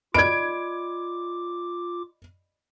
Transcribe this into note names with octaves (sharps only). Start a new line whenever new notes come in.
F4 D5 D#5 B5 D6 G#6 D7